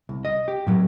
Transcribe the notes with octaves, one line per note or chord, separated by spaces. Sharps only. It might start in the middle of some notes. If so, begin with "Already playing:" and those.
C2
D#5
G4
A2 F#3